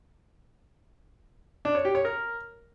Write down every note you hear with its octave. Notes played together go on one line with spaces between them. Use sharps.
D4
C#5
G4
C#5
A#4